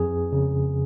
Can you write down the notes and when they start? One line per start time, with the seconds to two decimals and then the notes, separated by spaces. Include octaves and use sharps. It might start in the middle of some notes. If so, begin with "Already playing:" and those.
Already playing: F2 G#4
0.32 C#3